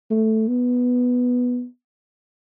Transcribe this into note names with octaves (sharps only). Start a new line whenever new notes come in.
A3
B3